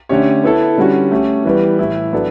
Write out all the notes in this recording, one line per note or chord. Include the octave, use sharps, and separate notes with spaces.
D3 A3 C#4 G4 C#5
B3 E4 A4
D3 G3 C#4 F#4
A3 C#4 G4
E3 G3 B3
A2 E3 A3 E4
F#3 B3 D4 A4